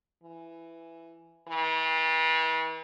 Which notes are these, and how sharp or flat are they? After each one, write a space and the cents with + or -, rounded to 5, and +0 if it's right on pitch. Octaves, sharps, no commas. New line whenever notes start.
E3 +10
E3 -40